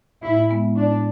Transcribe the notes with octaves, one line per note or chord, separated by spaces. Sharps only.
A2 E4
G#3 B3 E4
A2 D4